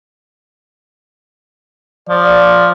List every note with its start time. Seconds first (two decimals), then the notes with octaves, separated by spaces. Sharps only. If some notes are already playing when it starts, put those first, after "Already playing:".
2.09 F3 D5